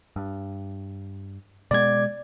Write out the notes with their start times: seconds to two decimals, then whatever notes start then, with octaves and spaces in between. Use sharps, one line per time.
0.16 G2
1.71 B2 G#3 B3 D5 G#6